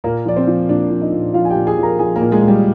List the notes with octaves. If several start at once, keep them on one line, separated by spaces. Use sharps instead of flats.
A#2 A#3 A#4
F3 D5
C4 C5
F3
A#2 D4 D5
F3
D#4 D#5
A#2
F3 F4 F5
G#5
G4 G5
A#2
G#4 G#5
F3
A#4 A#5
F3 G#4 G#5
A#3 A#4
A#2
G#3 G#4
A#2
G3 G4